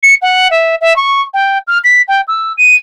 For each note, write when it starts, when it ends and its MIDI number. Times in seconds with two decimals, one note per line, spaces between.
0.03 0.14 97
0.22 0.48 78
0.50 0.75 76
0.81 0.96 76
0.96 1.21 85
1.33 1.58 79
1.67 1.78 89
1.84 2.02 95
2.08 2.21 79
2.28 2.53 88
2.57 2.75 99